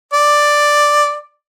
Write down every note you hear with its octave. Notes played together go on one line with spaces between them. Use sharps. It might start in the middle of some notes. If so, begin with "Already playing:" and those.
D5